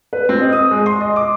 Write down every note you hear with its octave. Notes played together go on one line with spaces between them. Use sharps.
B4
C4
D#5
D#6
G#3
C6
D#5
D6